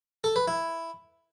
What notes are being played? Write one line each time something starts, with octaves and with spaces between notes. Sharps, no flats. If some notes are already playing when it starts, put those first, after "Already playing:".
A4
B4
E4